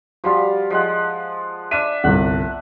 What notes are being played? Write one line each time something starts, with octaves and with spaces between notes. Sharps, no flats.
F3 G3 F4 F#4
F3 G#3 F#5
D4 E5 D#7
G1 C2 F#5